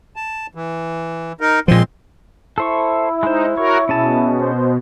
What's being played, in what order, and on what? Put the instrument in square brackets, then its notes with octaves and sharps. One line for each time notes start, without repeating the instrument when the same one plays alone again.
[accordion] A5
E3
D#4 A#4
[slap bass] A#2 F3 [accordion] G#3 C4 C6
[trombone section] E4 [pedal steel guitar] A4 C5 C#6
[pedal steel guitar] G#3 C5 [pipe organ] D#4
[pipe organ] F#4 A#4 [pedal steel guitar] C#5
[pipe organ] B2 [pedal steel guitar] C#4 G#4 A5
[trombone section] C5